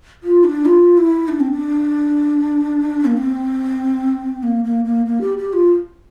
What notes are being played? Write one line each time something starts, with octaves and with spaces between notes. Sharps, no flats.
F4
D4
F4
E4
D4
C4
D4
A#3
C4
A#3
A#3
A#3
A#3
G4
G4
F4